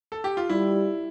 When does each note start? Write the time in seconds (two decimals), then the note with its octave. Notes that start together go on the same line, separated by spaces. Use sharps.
0.12 A4
0.24 G4
0.37 F4
0.49 G3 E4